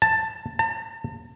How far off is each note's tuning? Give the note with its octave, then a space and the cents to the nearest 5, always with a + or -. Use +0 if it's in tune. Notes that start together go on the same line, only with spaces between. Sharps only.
A5 +10
A5 +40